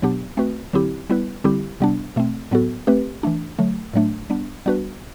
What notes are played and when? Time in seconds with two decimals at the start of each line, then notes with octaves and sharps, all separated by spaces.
0.02 B2 F#3 B3 D4 G4
0.37 A3 C4 F#4 B4
0.73 D3 F#3 C4 E4 G4
1.10 G3 B3 E4 B4
1.44 D3 G3 C4 E4 G4
1.80 C3 G3 B3 D4
2.16 B2 A3 C4
2.51 A2 F#3 B3 F#4 A4
2.87 A3 C4 G4 B4
3.23 E3 A3 D4
3.59 D3 F#3 A3
3.94 A2 F#3 A3 D4
4.30 G3 B3 D4
4.66 G3 B3 D4 F#4 B4